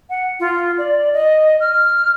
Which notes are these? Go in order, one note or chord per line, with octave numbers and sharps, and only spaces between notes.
F#5
F4
D5
D#5
F6